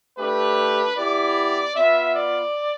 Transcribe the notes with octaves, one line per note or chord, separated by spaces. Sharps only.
A3 D4 G4 B4
B3 E4 G4 D5
B3 F4 E5
D5